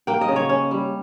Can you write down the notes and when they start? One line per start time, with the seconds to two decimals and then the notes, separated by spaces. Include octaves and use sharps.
0.07 A#3 G5
0.21 D#5
0.28 C#3
0.36 C#5
0.49 C#4
0.71 G3